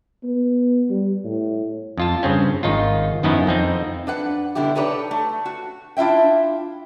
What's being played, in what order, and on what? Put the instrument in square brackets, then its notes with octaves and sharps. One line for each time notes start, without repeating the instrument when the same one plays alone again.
[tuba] B3
G3
A2
[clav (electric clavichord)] F2 F4 A5
G2 C#3 C4 C#4
G#1 D#3 D#4 F4
F#2 D#3 F3 B3 D#4 E4
F2 C4 D#4
[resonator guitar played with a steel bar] D4 B4 F#5
B2 D3 G3 E4 G4
D#4 G4 A4 B4 C#5 D5
A3
F#4
D4 E4 F4 E5 G5